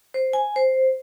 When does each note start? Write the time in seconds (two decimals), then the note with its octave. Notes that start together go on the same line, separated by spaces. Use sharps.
0.14 C5
0.33 G#5
0.56 C5